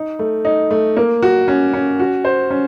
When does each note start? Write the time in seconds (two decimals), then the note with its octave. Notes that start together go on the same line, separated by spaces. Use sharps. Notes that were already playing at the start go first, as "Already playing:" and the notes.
Already playing: D#4
0.19 A3
0.45 D#4
0.71 A3
0.97 A#3
1.22 F#4
1.48 C#4
1.73 C#4
1.99 F#4
2.25 C5
2.50 C#4